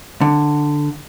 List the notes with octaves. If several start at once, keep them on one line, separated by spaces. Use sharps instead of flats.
D3